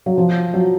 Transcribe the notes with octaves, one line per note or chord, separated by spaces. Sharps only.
F#3
F3
F#3